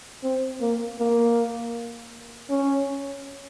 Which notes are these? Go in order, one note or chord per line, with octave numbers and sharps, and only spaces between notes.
C4
A#3
A#3
C#4